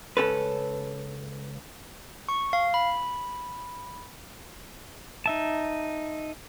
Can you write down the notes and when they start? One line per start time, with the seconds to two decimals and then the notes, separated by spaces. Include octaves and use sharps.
0.17 C#2 C#4 A4 B4
2.29 C#6
2.53 F5
2.74 B5
5.26 D#4 E5 A5